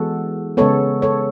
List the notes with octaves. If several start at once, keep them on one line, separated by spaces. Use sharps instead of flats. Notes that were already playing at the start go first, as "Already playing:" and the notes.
Already playing: E3 G#3 B3 F#4 A4
C#3 G#3 B3 A4 C#5
A4 C#5